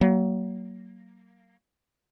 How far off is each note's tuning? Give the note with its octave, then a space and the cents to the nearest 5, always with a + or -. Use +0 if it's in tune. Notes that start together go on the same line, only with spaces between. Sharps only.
F#3 +30 A#3 +0